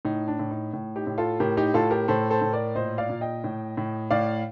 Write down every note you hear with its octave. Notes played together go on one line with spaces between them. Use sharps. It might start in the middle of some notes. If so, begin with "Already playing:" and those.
A2 D#4
D4
A2
D#4
A2
D#4 G4
A2
F4 A4
A2 G4 A#4
D#4 G4
A2 F4 A4
G4 A#4
A2 A4 C5
A4 C5
A2
A#4 D5
A#2 C5 D#5
D5 F5
A#2
D#5 G5
A2
A2
A2 D5 F5